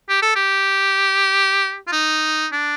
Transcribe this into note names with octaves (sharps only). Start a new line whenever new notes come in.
G4
A4
G4
F4
D#4
D4